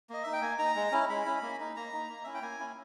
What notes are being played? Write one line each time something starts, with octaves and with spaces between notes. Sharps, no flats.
A#3 D#5
D#4 E5
G5
A#3 G#5
D#4 A#5
G#3
C#4 E4
G#3 B5
C#4 E4
A#3
D#4
A#3 A#5
D#4
A#3
C#4 E4 E5
G5
A#3 G#5
C#4 E4